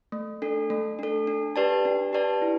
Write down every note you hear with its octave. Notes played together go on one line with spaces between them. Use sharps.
A3
D4 A4
A3
D4 A4
D4
G4 B4 D5 A5
D4
G4 B4 D5 A5
E4